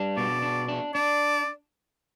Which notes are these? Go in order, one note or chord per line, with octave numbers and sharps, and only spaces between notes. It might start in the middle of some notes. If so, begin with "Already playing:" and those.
Already playing: G3 D4
B2 D5
D4
D4
D4 D5